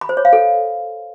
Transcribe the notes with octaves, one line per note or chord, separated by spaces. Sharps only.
B5
C5
C#5
F5
A4